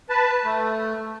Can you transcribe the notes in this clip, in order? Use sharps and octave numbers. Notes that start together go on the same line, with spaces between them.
B4 A5
A3